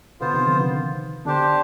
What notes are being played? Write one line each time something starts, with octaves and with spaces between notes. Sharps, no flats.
B2 D3 B3 F4 C5
C3 D#3
D3 F3
C3 D#3
B2 D3 D4 G4 C5